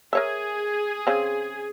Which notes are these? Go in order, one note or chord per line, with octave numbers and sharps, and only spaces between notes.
G#4 A#4 C#5 E5
C#3 C4